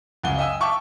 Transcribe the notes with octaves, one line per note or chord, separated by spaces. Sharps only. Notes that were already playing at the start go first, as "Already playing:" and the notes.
C#2 F#2 F#5 G#5 G7
D#5 E5 G5 G#5 D#6 E6
E5 G5 A5 C#6 D6